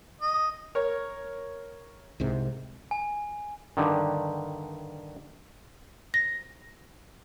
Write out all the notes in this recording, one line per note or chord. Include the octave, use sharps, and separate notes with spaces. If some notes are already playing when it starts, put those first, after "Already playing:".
D#5
A#4 C#5
C2 G#2 C3
G#5
G2 D3 D#3
A#6